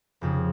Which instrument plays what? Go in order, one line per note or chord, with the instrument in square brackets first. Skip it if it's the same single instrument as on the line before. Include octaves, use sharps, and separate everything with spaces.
[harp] F1 F2 C#3